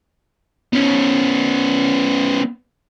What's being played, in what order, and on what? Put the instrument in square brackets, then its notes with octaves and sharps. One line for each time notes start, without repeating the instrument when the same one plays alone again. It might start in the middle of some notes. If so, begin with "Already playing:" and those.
[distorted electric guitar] B3 C#4